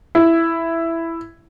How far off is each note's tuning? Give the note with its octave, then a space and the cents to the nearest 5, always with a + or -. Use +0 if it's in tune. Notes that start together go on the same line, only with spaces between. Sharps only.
E4 +5